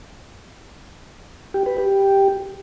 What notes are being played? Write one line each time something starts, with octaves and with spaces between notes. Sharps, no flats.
G4
B4
G4